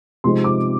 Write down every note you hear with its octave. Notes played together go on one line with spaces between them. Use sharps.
C3 F3 G#3 C4 D#4 C6
D6